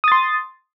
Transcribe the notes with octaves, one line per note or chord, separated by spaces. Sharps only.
C6 D#6 A6